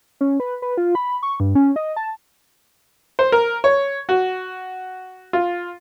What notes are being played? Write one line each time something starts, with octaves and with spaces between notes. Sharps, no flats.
C#4
B4
B4
F4
B5
C#6
G2
C#4
D#5
A5
C5
A#4
C#5
F#4
F4